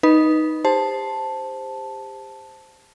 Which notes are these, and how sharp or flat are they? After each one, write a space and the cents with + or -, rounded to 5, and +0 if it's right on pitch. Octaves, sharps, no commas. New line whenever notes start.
D#4 +0 B4 -10
G4 +35 C5 +0 A5 +0